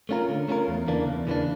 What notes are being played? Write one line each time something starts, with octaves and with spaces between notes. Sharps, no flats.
A3 C#4 F4 A#4
D3
A3 C#4 F4 A#4
E2
C#3 E3 A#3 D4
E2
C#3 E3 A#3 D4